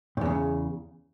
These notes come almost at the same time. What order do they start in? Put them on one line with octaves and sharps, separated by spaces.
A2 E2 C#3